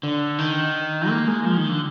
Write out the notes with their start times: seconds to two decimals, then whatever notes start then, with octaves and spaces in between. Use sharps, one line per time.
0.03 D3
0.38 D#3
1.09 A#3
1.28 G#3
1.45 F3
1.57 D#3
1.69 D3